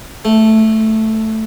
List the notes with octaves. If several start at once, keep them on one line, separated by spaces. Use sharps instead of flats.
A3